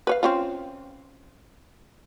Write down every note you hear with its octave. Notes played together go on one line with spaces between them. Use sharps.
B4 C#5 F5
C4 C#4 F4